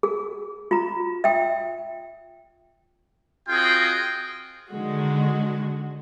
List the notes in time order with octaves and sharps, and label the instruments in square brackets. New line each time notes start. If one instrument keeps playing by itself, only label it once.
[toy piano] G#4
F4 A#5
E5 G5
[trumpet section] C4 F4 F#4 G#4 D#5 G5
[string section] D3 D#3 G#3 F#4